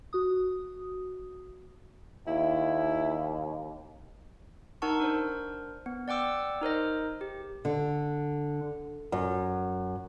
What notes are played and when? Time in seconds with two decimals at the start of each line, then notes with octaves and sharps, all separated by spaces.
0.13 F#4 D#6
2.27 D#2 E4
4.82 D#4 A#4 F#5 A5 C#6
5.00 D4 A#4 C5
5.86 B3
6.08 D5 F#5 G5 D6 E6
6.61 D#4 A#4 C5 D#5
7.21 G4
7.65 D3
9.12 F#2